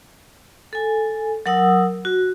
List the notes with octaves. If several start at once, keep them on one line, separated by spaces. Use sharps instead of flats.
A4 G#5
F#3 A#4 F#5 D#6 E6
F#4